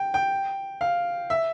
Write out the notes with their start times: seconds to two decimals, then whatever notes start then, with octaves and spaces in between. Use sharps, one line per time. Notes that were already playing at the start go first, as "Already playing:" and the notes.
Already playing: G5
0.14 G5
0.81 F5
1.30 E5